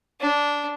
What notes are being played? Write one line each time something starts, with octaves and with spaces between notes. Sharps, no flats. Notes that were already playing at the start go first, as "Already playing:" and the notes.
D4